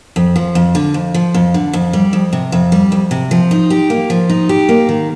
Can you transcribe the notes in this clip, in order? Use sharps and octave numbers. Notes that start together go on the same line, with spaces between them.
F2
F3
F2
D3
F2
F3
F2
D3
F2
G3
F2
C3
F2
G3
F2
C3
F3
D#4
G4
A#3
F3
D#4
G4
A#3
D#3